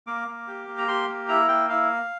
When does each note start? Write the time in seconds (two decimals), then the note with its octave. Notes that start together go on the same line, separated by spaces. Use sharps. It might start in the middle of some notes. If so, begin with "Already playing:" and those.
0.07 A#3 D6
0.28 A#3
0.47 G4
0.68 A#3
0.78 A#5
0.88 G4 C6
1.08 A#3
1.29 E4 A#5
1.48 A#3 G5
1.69 E4 F5